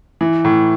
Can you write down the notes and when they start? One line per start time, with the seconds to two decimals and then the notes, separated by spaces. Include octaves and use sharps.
0.21 E3
0.45 A2